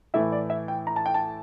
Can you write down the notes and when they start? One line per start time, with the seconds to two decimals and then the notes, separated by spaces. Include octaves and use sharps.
0.14 A2 E3 A3 E4 E5
0.32 D5
0.50 E5
0.68 G5
0.87 A#5
0.96 A5
1.06 G5
1.14 A5